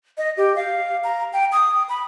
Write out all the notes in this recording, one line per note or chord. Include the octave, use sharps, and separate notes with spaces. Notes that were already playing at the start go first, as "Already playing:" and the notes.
D#5
G4
F5
A#5
G5
D#6
B5